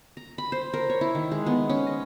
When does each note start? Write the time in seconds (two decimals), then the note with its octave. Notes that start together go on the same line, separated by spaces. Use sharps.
0.17 A#5
0.38 B5
0.52 C5
0.74 A#4
0.90 C#5
1.01 E4
1.15 D#3
1.32 G#3
1.46 B3
1.70 C#4
1.87 D#5